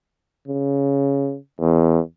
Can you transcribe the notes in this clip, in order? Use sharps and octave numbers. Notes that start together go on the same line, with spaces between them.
C#3
E2